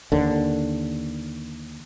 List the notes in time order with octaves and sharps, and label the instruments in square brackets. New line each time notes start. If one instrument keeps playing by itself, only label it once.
[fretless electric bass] D#2 D3